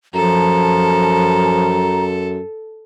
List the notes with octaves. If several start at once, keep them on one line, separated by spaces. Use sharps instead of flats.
F#2 F3 A4 A#5